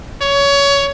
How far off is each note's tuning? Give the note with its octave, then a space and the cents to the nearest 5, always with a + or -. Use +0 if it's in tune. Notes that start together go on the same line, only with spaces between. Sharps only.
C#5 +20